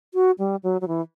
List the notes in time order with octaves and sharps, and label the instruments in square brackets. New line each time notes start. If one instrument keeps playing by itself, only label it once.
[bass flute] F#4
G3
F#3
F#3
E3